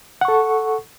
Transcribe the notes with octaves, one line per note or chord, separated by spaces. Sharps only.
A4 F#5 C#6